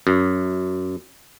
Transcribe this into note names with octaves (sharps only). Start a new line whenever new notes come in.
F#2